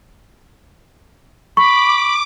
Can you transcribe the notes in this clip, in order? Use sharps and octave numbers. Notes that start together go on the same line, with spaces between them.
B5 C#6 D6